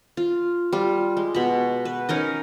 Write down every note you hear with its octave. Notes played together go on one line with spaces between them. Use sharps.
F4
G3 F4
G#3
B2 B5
B4
C#4 D#4 A#4 D#5